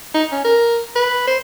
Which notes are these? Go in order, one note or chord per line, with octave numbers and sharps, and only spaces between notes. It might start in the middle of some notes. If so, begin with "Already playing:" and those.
D#4
C#4
A#4
B4
C5